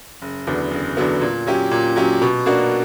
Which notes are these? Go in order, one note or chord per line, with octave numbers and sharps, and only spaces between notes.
F#1
E2 D3 F#3 B3
F#1
E2 D3 F#3 B3
A#2
F#3 C#4 G4
A#2
F#3 C#4 G4
B2
A#3 D4 F#4